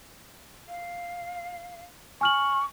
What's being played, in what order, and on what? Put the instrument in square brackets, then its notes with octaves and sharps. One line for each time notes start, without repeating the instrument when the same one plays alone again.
[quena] F5
[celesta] G#5 F6 F#7 [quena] C#6